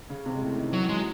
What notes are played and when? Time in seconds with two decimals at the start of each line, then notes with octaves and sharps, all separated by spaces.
0.09 C#3 C#4
0.26 C3 C4
0.34 G#3
0.41 A2 A3
0.58 D#3
0.73 E3 F#3
0.89 F#3 G#3